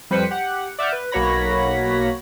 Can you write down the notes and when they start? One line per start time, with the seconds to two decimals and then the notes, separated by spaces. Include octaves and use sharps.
0.10 F2 G3 B4 C5 B6 C#7
0.31 G4 F#5
0.78 D5 E5 F#5 F6 G6
0.92 B4
1.11 B1 A#3 F#4 C#5 B5 A#6